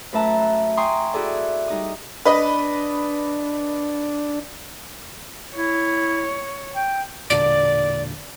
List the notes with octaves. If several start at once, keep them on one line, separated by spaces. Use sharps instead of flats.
F#2 A3 B4 E5 A5 A#5
G5 G#5 A#5 C6 C#6 D#6
E4 F#4 G#4 A4 D5 E5
G3 D#4 D#6
D4 B4 D#5 B5
E4 C#5
G5
E1 A#2 D3 D5